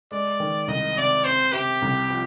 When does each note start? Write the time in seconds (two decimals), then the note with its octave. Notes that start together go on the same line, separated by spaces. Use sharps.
0.12 G#3 D5
0.40 D#3
0.68 C2 D#5
0.97 C3 D5
1.25 C4 C5
1.53 C3 G4
1.82 C2
2.10 F3